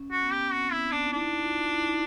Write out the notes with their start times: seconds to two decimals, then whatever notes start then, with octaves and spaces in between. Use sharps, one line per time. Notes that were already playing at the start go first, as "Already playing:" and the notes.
Already playing: C#4
0.11 F#4
0.22 B3
0.32 G4
0.52 C4 F#4
0.72 B3 E4
0.92 C4 D4
1.06 D#4
1.12 D4 E4
1.42 F4
1.73 E4
1.87 D#4